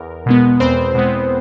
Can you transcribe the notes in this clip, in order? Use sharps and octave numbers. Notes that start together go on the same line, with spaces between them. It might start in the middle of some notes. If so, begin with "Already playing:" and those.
Already playing: E2 A#4
B2 G#3 B3
E2 C4 C5
B2 G#3 B3